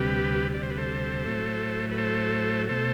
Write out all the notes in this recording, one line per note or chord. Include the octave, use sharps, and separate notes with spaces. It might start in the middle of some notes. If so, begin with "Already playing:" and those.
Already playing: D2 C3 G3 G4 B4
D5
C5
B4
A4 C5
A2 F#3 A3
B4
A4 C5
B2 A3 A4 C5